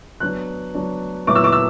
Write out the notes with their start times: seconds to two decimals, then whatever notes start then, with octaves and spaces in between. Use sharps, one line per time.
0.20 F#3 B3 D4 F#6
0.74 F#3 B3 D4
1.27 A#2 F#3 B3 E4 D6
1.35 E6
1.44 D6
1.52 E6